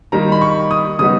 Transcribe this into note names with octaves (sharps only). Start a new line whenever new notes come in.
D#3 G3 A#3 D#4 A#5
B5
C#6
D#6
C#3 G3 B3 D#4 D#6